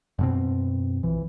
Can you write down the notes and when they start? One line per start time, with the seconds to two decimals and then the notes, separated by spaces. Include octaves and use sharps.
0.19 F#2 B2 C4
1.03 A#1 E3